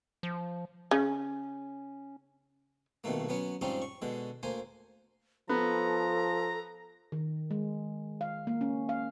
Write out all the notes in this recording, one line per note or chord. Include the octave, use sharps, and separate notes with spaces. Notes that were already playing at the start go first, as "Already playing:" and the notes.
F3
C#3 C#4
C2 B2 D#3 A3 A#3
F#3 B3 C#4
G#2 F3 G3 C4 C#4 D#4
C#6
B2 D3 G#3
D2 A#3 C5 G#5
F3 B3 A4 A#5
D#3
G#3
F5
A#3
C#4
F5